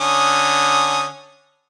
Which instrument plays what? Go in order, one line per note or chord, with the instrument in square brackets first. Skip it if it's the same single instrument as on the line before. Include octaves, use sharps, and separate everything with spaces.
[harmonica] D3 C#4 D#6